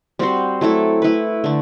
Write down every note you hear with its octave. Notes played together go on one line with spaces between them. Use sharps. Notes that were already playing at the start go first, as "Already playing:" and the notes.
G3 C4 F#4 C5
F#3 A3 E4 A4
A3 E4 B4
D3 A3